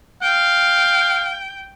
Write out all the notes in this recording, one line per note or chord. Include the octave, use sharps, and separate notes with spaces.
F5 G5